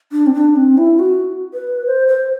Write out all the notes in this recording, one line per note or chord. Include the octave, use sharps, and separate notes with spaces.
D4
C4
D4
C4
E4
F#4
B4
C5
C5